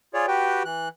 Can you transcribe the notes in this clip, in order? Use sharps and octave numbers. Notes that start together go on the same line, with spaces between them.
F4 G#4 C#5 D5
F#4 G4 B4 G5
E3 F#6